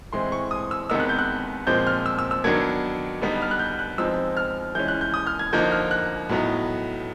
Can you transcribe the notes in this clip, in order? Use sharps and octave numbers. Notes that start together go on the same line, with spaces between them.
A2 E3 G#3 C4 C6
C#6
D#6
E6
C3 D#3 G#3 B3 D#4 E6
F#6
G6
F#6
A#2 F3 G#3 C4 G6
F6
E6
E6
E6
D#3 F#3 B3 D4 G#6
D3 G3 B3 D#4
F6
F#6
G6
F#6
F3 G#3 C4 D#4 E6
F6
E3 G#3 C#4 G6
F#6
G6
D#6
F6
G#6
D3 F3 A#3 D#4 G6
F6
F#6
A2 F#3 B3 D#4